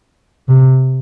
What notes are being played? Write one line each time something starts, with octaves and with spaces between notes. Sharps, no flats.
C3